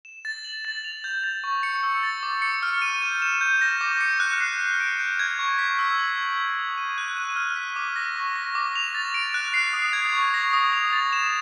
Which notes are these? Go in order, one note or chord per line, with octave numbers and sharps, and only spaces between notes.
E7
A6
F#7
A6
F7
G6
A6
C#6
C#7
E6
A6
D6
C#7
F6
D#7
G6
E7
G6
A#6
D6
C#7
F#6
C7
F6
D7
G6
G#6
C#6
B6
E6
F#7
G#6
B6
D#6
D#7
F#6
D#7
F6
B6
D6
A#6
C#6
A#6
D6
F7
A6
D7
F#6
C7
D#6
G#6
C#6
A#6
D#6
F7
A6
E7